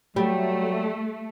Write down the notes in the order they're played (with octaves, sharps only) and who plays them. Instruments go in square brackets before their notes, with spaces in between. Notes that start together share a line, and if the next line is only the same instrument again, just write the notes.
[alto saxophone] F#3 [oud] G3 [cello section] A3